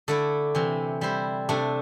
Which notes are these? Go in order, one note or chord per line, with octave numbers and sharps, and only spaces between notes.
D3 A3 E4 A4 D5
C3 E3 C4
G3 E4 C5
C3 A3 D4